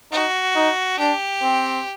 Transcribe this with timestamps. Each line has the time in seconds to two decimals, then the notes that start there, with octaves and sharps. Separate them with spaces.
0.12 D#4 F#4
0.56 D#4
0.99 D4 G4
1.43 C4